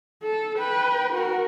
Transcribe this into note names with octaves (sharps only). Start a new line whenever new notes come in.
A4
B4 G5
F#4 A#4